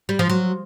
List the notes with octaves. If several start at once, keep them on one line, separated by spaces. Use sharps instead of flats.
G3
F3
F#3